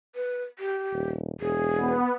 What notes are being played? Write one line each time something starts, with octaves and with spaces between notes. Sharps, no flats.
B4
G4
D#1
E1 G#4
B3